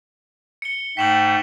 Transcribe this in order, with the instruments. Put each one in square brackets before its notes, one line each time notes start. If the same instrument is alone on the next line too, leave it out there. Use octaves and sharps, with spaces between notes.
[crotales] C#7 G7
[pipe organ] G#2 A3 [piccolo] G5 [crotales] B6 E7 F#7